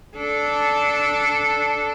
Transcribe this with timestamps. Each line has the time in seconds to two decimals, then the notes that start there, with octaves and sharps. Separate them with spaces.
0.18 D4 A4